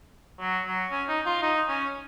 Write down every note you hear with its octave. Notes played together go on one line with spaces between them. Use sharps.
F#3
F#3
C#4
D#4
F4
D#4
C#4